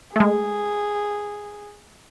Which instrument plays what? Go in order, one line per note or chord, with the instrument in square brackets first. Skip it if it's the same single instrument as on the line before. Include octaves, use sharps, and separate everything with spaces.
[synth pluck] G#3 A3 [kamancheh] G#4